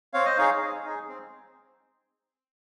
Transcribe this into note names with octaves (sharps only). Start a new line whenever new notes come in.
C4 C#5 F5
C5 D#5
D#4 G#4 C#5 F5
C4
D#4 G#4
C4